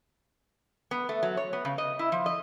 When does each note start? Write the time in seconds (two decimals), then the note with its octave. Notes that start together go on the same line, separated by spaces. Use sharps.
0.91 B3
1.09 A3
1.23 F#3
1.37 C#5
1.53 B3
1.65 C#3
1.78 D#5
1.99 E4
2.12 F3
2.26 D#5